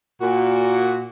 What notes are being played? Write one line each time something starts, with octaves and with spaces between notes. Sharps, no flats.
A#2 F#4